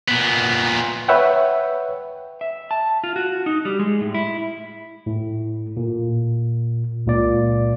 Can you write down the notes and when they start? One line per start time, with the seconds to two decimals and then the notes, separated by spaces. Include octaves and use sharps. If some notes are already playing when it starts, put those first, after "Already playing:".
0.08 A#2 B3
1.08 B4 C#5 E5 F#5 G5
2.41 E5
2.71 A5
3.04 F4
3.16 F#4
3.46 D#4
3.65 G3
3.79 G#3
4.01 A2
4.14 E4
5.06 A2
5.77 A#2
7.06 C#2 A#2 D5